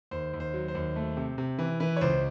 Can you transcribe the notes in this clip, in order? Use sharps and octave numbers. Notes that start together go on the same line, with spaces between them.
D#2 C5
D#2
C5
F#3
C5
D#2
A3
C3
C3
E3
E3 B4
C#5
C#2 C5